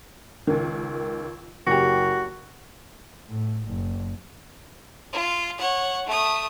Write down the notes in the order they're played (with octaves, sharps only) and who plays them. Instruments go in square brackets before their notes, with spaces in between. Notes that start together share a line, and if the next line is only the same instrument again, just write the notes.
[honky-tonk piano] C#2 D#3
[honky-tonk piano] F#1 G4 [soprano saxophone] F#4
[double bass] A2
F#1
[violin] F4
C#5 F#5
A3 D#6